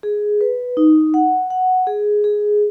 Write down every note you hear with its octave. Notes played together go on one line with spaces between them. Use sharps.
G#4
B4
D#4
F#5
F#5
G#4
G#4